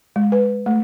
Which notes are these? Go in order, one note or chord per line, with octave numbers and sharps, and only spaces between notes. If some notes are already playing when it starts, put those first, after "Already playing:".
G#3
B4
A3